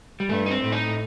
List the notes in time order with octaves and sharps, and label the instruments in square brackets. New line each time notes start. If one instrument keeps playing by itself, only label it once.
[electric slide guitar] G3
[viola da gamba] G2 [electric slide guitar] A3
[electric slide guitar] D#4
C4
[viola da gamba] A2
[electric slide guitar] D#4